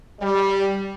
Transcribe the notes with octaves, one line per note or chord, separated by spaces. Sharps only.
G3